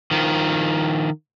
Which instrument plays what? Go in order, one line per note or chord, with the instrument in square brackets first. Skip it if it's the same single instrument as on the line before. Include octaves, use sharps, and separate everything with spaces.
[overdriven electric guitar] D#3 F3